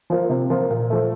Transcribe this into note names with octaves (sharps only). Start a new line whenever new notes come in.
F3 A#3 F4
C3
F3 A#3 F4
A#2
F3 A3